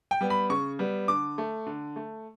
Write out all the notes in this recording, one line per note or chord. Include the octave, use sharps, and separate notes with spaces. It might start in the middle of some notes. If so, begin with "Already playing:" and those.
G5
G3 B3
B5
C#3 C#6
G3 B3
D3 D6
A3
D3
A3